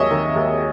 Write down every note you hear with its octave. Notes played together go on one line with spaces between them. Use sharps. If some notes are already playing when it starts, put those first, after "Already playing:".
Already playing: D#2 F#3 G#4 C#5 D#5 E5
D#3
D#2